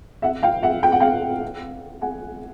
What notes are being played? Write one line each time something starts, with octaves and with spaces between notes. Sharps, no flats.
E5 F#5
F5 G5
E5 F#5
G5
F#5
F5 G5
F#5 G#5